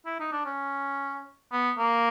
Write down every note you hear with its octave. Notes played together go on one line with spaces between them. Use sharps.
E4
D#4
D4
C#4
B3
A#3